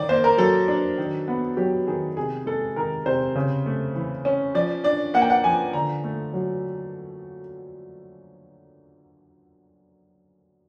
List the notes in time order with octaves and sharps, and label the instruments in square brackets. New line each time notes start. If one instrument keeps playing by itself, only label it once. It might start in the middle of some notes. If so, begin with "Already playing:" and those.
Already playing: [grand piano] D#3 D5
A#3 C5
A#4
F#3 A4
D4
D#3
B3
F#3 G4
D#3 G#4
C3 G#4
G#3 A4
D#3 A#4
C3 C5
C#3
A3
E3
C#4
F3 D5
D4 D5
A#3 F#5
G5
F#5
F3 G#5
D3 A#5
A3
F#3